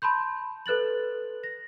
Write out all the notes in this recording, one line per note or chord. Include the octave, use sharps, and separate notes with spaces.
A5 B5 C6 G6
A4 B4 F#6 A6 F#7
A#6